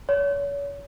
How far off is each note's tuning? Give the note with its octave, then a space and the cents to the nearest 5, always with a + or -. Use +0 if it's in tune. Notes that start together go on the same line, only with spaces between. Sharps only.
C#5 +35